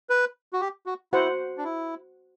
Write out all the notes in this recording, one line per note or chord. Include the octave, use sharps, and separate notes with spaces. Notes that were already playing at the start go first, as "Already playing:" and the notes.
B4
F#4
G4
F#4
E4 F#4 C5 F#5
D4
E4